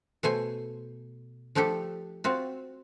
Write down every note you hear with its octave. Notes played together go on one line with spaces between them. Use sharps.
B2 A3 C5 G#5
F3 A3 D4 G4 A4
C4 F4 F#4